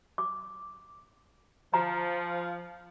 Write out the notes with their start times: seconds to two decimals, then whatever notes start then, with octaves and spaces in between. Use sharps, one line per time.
0.18 D6
1.74 F3 A#5